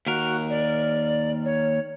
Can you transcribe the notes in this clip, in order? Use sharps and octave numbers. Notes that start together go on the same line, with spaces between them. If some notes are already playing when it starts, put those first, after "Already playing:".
D#2 F#4 A#4
D5
C#5